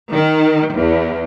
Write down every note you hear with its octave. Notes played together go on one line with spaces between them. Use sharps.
D#3
E2